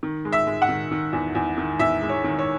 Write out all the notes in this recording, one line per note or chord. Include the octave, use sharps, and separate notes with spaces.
D#3
G#3
E5
G#3
F#5
D#3
D#3
E2
E2
D#3
E2 E5
G#3
C#5
D#3
C#5